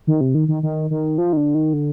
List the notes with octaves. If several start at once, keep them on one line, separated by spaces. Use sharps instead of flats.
D#3
C3
D#3
D#3
D#3
D#3
F3
D#3
D3
D#3
D3